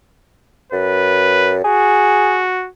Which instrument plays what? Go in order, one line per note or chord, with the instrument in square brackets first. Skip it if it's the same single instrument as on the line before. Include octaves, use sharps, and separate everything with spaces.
[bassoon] F#2 [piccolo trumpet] B4
[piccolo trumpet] F#4 [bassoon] G#4